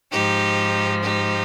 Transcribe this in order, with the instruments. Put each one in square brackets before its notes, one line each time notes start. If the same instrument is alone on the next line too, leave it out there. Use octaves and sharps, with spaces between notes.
[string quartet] G#2 F3 D#4 G4
D#4 G4